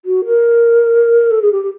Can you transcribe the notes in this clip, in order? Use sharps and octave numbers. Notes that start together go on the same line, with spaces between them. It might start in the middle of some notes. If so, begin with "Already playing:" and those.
F#4
A#4
A4
G#4
G4
G4